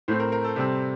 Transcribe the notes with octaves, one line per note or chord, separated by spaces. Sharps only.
A2 A3 C4 C5
A#4
A#4
A4
C3 G3 C4